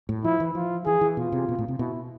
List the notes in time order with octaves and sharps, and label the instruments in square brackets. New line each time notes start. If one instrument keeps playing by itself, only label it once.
[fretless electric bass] A2
[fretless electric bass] F3 [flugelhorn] E4
[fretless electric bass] E3
[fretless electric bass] F3 [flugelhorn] F4
[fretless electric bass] E3 [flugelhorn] G#4
[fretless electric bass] E3
[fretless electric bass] B2 [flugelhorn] F4
[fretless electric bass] C3
B2
A2
C3
[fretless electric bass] B2 [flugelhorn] E4